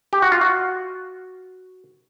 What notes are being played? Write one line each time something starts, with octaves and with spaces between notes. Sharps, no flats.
G4
F#4
F4
F#4